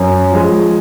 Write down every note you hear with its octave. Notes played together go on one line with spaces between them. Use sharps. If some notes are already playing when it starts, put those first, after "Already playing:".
Already playing: F#2
F3 G#3